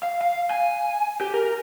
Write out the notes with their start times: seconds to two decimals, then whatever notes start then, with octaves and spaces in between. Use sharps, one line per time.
0.03 F5
0.21 F5
0.51 G#5
1.21 G4
1.34 A#4